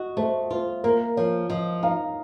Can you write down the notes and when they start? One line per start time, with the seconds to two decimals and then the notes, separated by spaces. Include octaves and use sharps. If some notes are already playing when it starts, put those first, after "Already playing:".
Already playing: F#4 D#5
0.17 A3 C5
0.51 F4 C5
0.84 A#3 A#4
1.17 F3 C#5
1.50 F3 D#5
1.83 D#4 F5